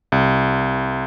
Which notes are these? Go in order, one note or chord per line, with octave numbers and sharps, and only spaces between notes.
C2